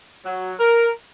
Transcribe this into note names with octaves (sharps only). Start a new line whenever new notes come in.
F#3
A#4